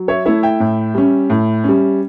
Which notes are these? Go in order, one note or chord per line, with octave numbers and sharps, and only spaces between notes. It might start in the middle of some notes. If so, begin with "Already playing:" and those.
Already playing: F#3
C#5 E5
A3 E4 C#5 E5
E5 G5
A2
G3 C#4
A2
G3 C#4